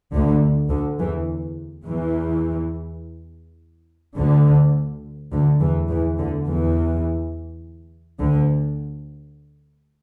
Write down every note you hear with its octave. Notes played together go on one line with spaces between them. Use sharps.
D2 D3
D2 D3
E2 E3
E2 E3
D2 D3
D2 D3
E2 E3
E2 E3
D2 D3
E2 E3
D2 D3